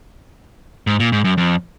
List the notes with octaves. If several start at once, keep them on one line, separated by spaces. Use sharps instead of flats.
G#2
A#2
G#2
F#2
F2